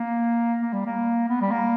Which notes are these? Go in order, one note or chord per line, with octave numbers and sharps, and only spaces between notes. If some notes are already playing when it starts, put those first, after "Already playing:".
Already playing: A#3
A#3
G3
A#3
B3
G3
A#3